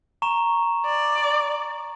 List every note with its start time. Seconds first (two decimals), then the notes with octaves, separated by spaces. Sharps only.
0.22 A#5 C#6 E7
0.86 D5